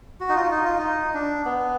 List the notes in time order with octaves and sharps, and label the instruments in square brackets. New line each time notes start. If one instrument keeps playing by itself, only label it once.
[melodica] F#4
D#4
F4
D#4
F4
D#4
D4
B3